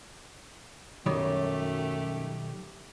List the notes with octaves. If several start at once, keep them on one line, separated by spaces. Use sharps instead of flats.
B1 F#2 D#3 G3 A3 G4 C#5